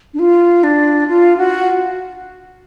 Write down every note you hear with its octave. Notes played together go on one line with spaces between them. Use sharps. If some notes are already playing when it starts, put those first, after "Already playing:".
D4
F4
D4
F4
F#4